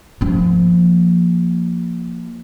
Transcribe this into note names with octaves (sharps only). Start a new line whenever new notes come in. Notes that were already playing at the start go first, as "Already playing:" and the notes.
F3 A#3